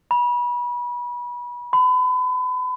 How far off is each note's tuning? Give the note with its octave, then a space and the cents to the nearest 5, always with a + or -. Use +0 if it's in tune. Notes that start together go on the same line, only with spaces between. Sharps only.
B5 -30
B5 +35